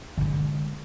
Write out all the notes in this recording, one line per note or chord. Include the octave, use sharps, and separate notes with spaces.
D3 G#3